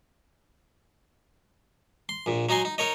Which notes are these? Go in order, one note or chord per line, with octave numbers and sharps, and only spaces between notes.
C6
A#1 A#2
F#3 D#4 D#5 G#5 C6
D#4
D#4 A#4 C#5 D#5